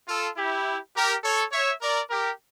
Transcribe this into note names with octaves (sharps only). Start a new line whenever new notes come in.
F4 A4
E4 G4
G4 A#4
A4 C#5
C#5 E5
A#4 D5
G4 A#4